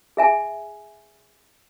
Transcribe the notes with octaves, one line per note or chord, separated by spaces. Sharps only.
G#4 E5 G#5